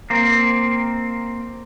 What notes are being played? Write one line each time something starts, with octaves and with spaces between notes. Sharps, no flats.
A#3 C4